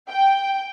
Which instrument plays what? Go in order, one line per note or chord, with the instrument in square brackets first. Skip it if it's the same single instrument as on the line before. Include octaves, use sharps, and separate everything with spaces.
[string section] G5